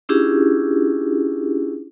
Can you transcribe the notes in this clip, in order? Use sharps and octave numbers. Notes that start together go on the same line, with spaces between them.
C#4 D4 E4 F4 G4 G#4